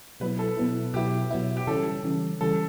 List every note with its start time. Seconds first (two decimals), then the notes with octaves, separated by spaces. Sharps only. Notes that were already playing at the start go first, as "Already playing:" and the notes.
0.20 B2 F#3 B3 E4 B4
0.39 A4
0.57 B2 F#3 B3 E4
0.94 B2 F#3 B3 E4 G4
1.30 B2 F#3 B3 E4
1.57 G4
1.67 C#3 E3 G3 C#4 A4
2.04 C#3 E3 G3 C#4
2.41 C#3 E3 G3 C#4 A4